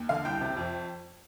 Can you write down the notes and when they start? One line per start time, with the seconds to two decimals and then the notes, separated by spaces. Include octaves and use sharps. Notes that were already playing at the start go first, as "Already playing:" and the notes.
Already playing: D#2
0.09 D3 F5
0.25 C2 G5
0.41 C3
0.57 F2